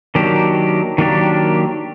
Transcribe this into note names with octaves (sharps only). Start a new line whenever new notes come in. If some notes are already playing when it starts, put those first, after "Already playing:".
D#3 F#3 A#3 D4 G4
D#3 F#3 A#3 D4 G4